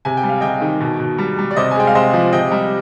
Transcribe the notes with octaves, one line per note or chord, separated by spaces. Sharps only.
C3 G#5
G5
G3
F5
C3 D#5 G5
D#3
B2
B2
G3
G3
D5
C3 C5 D#5
G#5
G#3 G5
F5
C3 C5 D#5
F3
C3 D#5 G5
G3